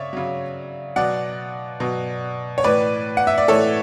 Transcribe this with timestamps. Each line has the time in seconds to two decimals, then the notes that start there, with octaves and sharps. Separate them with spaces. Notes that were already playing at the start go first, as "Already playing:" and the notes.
Already playing: C#3 C#5 D5 E5
0.13 C#3 F#3
0.96 B2 F#3 D5 F#5
1.80 B2 F#3
2.58 C#5
2.64 A2 E3 B4 D5
3.17 F#5
3.27 E5
3.38 D5
3.48 A2 E3 A4 C#5